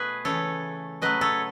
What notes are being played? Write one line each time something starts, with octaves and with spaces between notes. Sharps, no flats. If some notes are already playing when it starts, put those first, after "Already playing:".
Already playing: B2 A3 G#4 B4
C#3 E3 A3 A4 C#5
C#3 F#3 A3 B4 D#5
A4 C#5